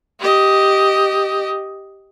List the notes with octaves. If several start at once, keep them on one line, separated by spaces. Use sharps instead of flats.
G4 D#5